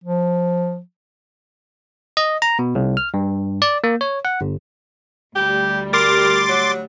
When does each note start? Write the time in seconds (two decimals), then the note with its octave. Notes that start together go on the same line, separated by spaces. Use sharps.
0.04 F3
2.17 D#5
2.42 A#5
2.59 B2
2.75 C2
2.97 F6
3.14 G2
3.62 D5
3.84 A#3
4.01 C#5
4.25 F#5
4.41 G1
5.36 D2 G3 G4
5.93 A#4 C6 D6 A6
6.49 F#3